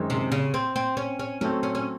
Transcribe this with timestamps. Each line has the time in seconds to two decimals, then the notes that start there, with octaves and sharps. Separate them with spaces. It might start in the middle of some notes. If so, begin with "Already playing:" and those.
Already playing: F#2 D#3 G#3 C4 D#4
0.10 C3
0.32 C#3
0.54 C4
0.76 C4
0.97 C#4
1.19 C#4
1.41 F#3 A3 C4 C#4
1.63 C#4
1.75 C#4